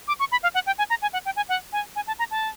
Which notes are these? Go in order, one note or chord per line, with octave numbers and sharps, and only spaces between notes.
D6
C#6
B5
F5
F#5
G5
G#5
A#5
G#5
F#5
G5
G#5
F#5
G#5
G#5
A5
A#5
A5